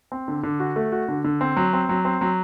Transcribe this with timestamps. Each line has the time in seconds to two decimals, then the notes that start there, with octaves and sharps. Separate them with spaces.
0.12 C4
0.28 D3
0.43 D3
0.60 F#4
0.76 A3
0.92 F#4
1.08 D3
1.24 D3
1.41 C4
1.57 F#3
1.73 C4
1.89 F#3
2.05 C4
2.21 F#3